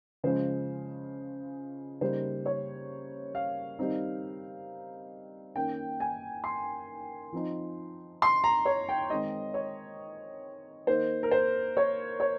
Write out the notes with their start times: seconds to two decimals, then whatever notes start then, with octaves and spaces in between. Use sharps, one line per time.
0.24 C#3 F3 G#3 C#4 C5
2.01 C#3 G3 A#3 D#4 C5
2.46 C#5
3.35 F5
3.79 D#3 G3 C4 D#4
5.55 D#3 A#3 C#4 G5
6.00 G#5
6.44 C6
7.33 F3 C4 D#4
8.22 C6
8.44 A#5
8.65 C#5
8.89 G5
9.10 D#3 G#3 C4 D#5
9.54 C#5
10.87 D#3 A#3 D#4 C5
11.23 A#4
11.31 C5
11.77 C#5
12.20 C#5